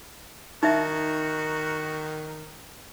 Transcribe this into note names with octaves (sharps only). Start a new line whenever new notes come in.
D#3 D#4 F#4 E5